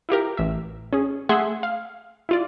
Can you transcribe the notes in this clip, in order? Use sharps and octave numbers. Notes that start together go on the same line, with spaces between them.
E4 F4 G4 A#4
A1 E5
C#4 G#4
A3 G#4 E5 F#5 C6
F5
E4 F4 D5